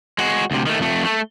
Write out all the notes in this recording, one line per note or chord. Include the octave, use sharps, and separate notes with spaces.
G#3 F#4
D2 C3
D#3 A3
F2 A3
A3